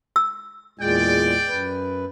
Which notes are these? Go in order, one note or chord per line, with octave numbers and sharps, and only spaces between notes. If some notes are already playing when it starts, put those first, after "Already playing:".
E6
E2 A#2 G#3 D5 G5
F#2 B4